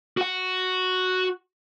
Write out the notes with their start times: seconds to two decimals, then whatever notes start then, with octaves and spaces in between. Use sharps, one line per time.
0.17 F#4 F#5